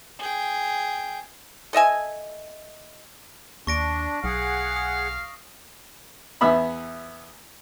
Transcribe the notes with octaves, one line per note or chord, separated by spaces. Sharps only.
G#4 G5
A4 D#5 E5 G#5
D#2 D4 C#6 A#6 D7
B1 G#4 F5 F#5
D#6
E2 B3 E5 B5